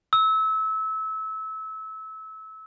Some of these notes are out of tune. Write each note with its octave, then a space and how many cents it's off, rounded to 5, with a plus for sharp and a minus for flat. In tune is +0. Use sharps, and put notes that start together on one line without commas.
E6 -25